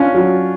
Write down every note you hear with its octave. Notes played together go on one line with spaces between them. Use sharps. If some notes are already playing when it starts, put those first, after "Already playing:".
Already playing: C#4 D4 F4
F#3